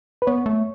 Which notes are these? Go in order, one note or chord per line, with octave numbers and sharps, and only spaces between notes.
B4
B3 C#5
A3